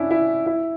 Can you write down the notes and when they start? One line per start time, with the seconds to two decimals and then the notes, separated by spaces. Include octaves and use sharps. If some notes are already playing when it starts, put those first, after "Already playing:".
Already playing: C#4 D4 E4
0.11 E4
0.46 E4